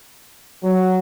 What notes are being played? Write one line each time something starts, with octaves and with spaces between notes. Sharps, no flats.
F#3